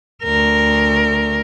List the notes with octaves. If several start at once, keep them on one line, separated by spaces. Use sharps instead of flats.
D2 A#4